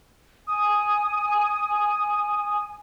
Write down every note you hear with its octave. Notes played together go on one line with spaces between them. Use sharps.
G#5 D#6